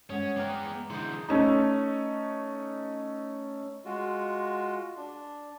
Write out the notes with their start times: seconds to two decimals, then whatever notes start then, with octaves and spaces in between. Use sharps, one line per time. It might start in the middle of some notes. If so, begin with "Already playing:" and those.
0.10 G2 G#3 C#4 C#5 F#5 D#6 G#6
0.37 B3 G#4 G5 A#5 D6 F6
0.90 D3 E3 G#4 C6 D#6 G6
1.29 A3 C#4 D#4
3.85 G#3 F4 F#4
4.97 D4